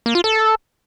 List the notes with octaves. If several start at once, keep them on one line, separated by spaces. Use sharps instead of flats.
A#3
F4
A4